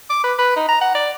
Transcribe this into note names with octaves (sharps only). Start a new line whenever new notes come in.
D6
B4
B4
D#4
A#5
F#5
D5